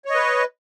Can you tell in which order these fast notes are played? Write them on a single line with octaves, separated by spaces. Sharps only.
C#5 D#5 B4